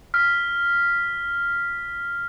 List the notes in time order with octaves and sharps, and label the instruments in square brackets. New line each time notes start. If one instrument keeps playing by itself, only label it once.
[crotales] F6 B6